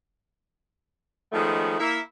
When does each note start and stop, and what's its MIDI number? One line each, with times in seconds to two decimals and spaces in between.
1.33 1.74 51
1.33 1.74 53
1.33 1.74 56
1.33 1.74 57
1.33 1.74 59
1.33 1.74 61
1.80 1.99 58
1.80 1.99 64
1.80 1.99 76